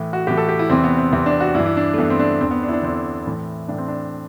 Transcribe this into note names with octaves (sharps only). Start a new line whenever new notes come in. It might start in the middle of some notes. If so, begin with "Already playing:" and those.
Already playing: A2 E3
F#4
A2 E3 G4
A4
G4
E4
E2 C3 E3 C4
B3
C4
E2 C3 E3 C4
D4
F#4
G2 E4
E3
E4
D4
A3
G2 E3 B3
C4
D4
E2 D3 C4
B3
D4
E4
D4
E2 D3 C4
A2 E3
A2 E3 D4
C4
D4